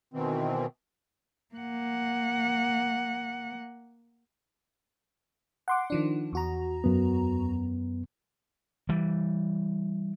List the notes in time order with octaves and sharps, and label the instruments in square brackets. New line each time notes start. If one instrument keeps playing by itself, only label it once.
[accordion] B2 D#3 E3 C4
[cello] A#3 F#5
[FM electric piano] F#5 C6 D6
D#3 F3 D4
E2 F#4 A#5
[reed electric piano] F#2 B3
[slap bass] E3 G3